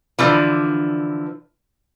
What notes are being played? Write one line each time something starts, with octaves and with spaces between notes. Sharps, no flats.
D3 E3 F3